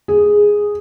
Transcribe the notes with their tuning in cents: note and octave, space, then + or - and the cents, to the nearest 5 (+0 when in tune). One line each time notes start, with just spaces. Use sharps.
G#4 -5